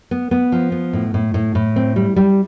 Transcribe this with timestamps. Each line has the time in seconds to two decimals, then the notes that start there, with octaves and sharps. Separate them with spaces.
0.11 B3
0.31 B3
0.52 F3
0.72 B3
0.93 A2
1.14 A2
1.34 A2
1.55 A2
1.76 C4
1.96 G3
2.16 G3